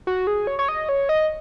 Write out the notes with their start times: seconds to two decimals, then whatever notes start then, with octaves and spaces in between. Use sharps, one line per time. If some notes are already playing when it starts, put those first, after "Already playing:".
0.07 F#4
0.27 G#4
0.47 C#5
0.59 C#5
0.69 D#5
0.89 C#5
1.09 D#5